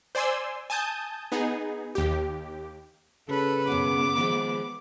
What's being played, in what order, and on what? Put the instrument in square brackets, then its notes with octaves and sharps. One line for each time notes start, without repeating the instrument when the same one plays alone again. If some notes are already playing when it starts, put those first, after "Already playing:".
[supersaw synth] C5 D5 G#5 C6 E6
G#5 A5 D#6 G6
B3 D#4 G#4
D#2 G4
[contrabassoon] C#3 [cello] A4 B4
[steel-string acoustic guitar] F#2 B2 [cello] B3 [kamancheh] D6
[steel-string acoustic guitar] D#3 F3 G#3